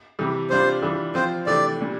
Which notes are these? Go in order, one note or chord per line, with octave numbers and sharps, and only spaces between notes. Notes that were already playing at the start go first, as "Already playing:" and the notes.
C3 E3 G3
C3 G3 D4 F4 C5
E3 G3 D4 F4
F3 C4 F4 C5
C3 E3 A3 D4 G4 D5
A#2 G3 D4